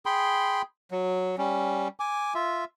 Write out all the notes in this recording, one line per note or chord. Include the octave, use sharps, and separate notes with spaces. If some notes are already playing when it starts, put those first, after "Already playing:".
G#4 G5 B5 C6
F#3
G3 C#4
G#5 D6
F4 E5